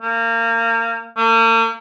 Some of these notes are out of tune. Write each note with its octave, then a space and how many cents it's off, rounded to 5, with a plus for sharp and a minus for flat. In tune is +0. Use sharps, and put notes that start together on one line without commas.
A#3 -25
A#3 -40